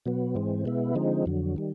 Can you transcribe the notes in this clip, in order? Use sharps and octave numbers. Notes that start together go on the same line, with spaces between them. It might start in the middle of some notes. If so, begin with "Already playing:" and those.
B2 F#3 B3
G#2 E3 G#3 C4
B2 G#3 B3 E4
D3 F3 G#3 C4 D#4
F2 D3 F#3
D#3 G3